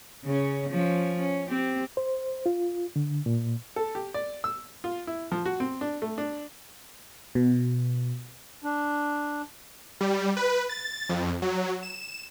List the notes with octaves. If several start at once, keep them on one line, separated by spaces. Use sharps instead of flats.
C#3 C#4
F3 C#4
C#4
C4 G4
C5
F4
D3
A#2
A4
G4
D5
E6
F4
E4
F3
F#4
C4
D4
A3
D4
B2
D4
G3
B4
A6
F2
F#3
E7